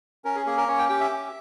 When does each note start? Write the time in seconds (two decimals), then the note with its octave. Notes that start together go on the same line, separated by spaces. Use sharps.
0.25 C#4 A#4
0.36 G#4
0.46 A#3 G#4
0.57 A#4
0.68 C#4 C#5
0.78 G5
0.89 G4 G5
1.00 E5
1.11 C#4